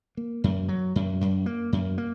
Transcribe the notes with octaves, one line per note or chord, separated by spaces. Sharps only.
A#3
F#2
F#3
F#2
F#2
A#3
F#2
A#3